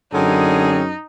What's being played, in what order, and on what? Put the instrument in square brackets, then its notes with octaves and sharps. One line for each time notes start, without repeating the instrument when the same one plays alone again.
[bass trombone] F#2 [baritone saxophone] D3 [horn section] C4 C#4 G#4 [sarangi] D#4